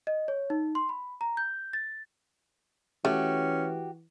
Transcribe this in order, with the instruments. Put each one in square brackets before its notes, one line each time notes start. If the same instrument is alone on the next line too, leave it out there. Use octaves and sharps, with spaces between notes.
[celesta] D#5
C#5
D#4
C6
B5
A#5
G6
A6
[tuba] E3 [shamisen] A3 [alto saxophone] C#4 [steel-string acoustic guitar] F#4 G4